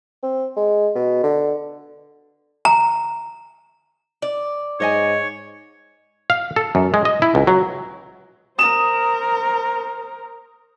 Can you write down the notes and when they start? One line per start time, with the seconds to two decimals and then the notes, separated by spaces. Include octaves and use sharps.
0.23 C4
0.56 G#3
0.95 B2
1.23 D3
2.65 A#5
4.22 D5
4.80 G#2 C5 C#5 D#5 G#5
6.30 F5
6.56 A4
6.75 F#2
6.94 G#3
7.05 D#5
7.22 E4
7.35 C#2
7.47 F#3
8.59 A#4 C5 D#6 E7